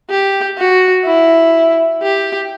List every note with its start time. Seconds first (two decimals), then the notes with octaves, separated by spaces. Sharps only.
0.10 G4
0.58 F#4
1.05 E4
2.02 G4